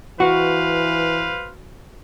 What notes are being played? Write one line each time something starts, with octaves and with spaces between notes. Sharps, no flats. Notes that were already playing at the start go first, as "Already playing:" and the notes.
E3 F#4 B4 C5 F5